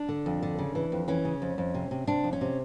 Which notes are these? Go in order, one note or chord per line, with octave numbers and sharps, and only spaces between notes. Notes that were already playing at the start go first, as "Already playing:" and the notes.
Already playing: D4
D3
F2
D3
C#3
E3
F2
E3 C#4
C#3
F2
F2
C3
C3
C3 D4
F2
C#4
C3